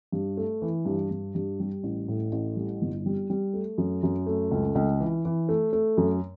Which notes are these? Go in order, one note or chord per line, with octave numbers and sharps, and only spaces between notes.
G2
A3
E3
G2
G2
G2
G3
A1
A2
A1
G3
G1
G3
G3
A3
F#2
F#2
A3
C#2
C#2
E3
E3
A3
A3
F#2